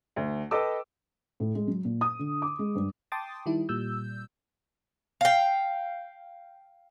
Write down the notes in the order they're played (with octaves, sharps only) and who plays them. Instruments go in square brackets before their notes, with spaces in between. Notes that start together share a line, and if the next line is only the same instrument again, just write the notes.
[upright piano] D2
A4 B4 D#5 G5 D6 E6
[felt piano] A2
G#3
F#3
A#2
D#6
D3
D6
G#3
G2
[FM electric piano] G5 A5 C6 D6 D#6 A6
D#3 G3 E4
A#2 G3 E6 G6
[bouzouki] F5 G5